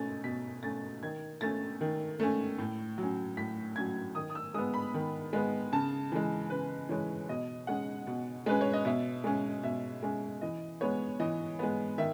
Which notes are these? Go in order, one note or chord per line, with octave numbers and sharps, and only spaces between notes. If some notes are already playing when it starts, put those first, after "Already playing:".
Already playing: B2 A3 C#4 A6
B2 B6
A3 C#4 A6
D#3 G#6
A3 C#4 A6
D#3
A3 C#4
A2
F#3
C#4
A2 B6
F#3 C#4 G#6
D#3 D#6
D#6
E6
G#3 B3 D#6
B5
D#3
G#3 B3
C#3 A5
E3 G#3
C#3 B4
E3 G#3 C#5
B2 D#5
G#3 C#4 F#5
B2
G#3 C#4 B4
C#5
D#5
B2 E5
G#3 C#4
B2 E5
G#3 C#4
E3 D#5
G#3 B3 C#5
E3 D#5
G#3 B3
D#3 E5